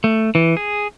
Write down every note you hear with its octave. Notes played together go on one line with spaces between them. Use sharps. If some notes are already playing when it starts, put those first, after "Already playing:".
A3
E3
G#4